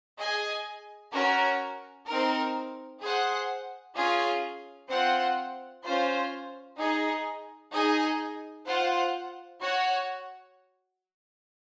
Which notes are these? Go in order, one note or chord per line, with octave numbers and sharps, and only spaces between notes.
G#4 D#5 G#5
C#4 F#4 A#4
C4 D#4 A#4
G#4 C5 F#5
C#4 F4 G#4
C4 F4 C5 F#5
C#4 F4 C5
D#4 G#4 D#5
D#4 G#4 D#5 G#5
F4 C5 F#5
F#4 C#5 F#5